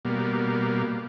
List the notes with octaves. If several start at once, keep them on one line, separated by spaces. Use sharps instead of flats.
B2 G3 A#3